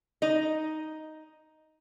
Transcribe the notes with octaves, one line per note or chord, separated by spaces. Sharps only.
D#4 D#5